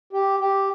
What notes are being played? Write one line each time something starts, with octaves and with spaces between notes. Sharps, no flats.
G4
G4